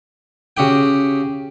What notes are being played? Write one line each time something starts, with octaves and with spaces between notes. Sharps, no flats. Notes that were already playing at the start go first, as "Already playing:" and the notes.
C#3 F#4 G4 G5